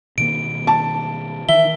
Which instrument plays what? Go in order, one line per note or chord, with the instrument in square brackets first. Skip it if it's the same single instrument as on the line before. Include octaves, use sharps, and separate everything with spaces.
[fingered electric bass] B2 D#3 A#3 [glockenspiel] D7
[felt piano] A5
[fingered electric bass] D#3 E3 [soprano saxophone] E5 [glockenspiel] G7